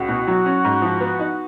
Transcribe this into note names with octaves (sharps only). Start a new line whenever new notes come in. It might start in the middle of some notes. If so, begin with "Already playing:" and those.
Already playing: C#2 F#4
B2
F#3
C#4
G#2
F3
B3
D#4